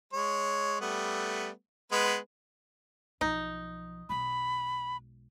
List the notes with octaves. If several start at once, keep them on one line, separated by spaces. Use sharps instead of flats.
G#3 C#5
G3 A3 B3
G#3 B3 B4
B1 F3 D#4
B1 G#3 B5